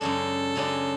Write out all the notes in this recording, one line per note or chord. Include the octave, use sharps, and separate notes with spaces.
F#2 C#3 G#3 D4 A4
F#2 C#3 G#3 D4